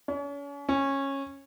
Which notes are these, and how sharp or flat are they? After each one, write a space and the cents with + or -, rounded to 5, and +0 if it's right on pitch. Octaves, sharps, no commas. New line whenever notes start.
C#4 +40
C#4 -15